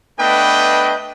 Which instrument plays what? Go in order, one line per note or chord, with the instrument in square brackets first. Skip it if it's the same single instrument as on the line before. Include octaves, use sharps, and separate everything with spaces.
[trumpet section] A3 B3 D4 B4 D#5 G5